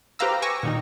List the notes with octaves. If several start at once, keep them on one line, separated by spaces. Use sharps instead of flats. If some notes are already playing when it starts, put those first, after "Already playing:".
G4 B4 C5 F5 A#5 E6
G#5 C#6 D6 E6 A#6 C#7
A#2 D#3 D#4